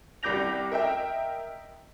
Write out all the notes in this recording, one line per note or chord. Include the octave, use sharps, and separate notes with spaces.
C2 G3 D6 G6 A#6 F7
A#4 D#5 E5 G5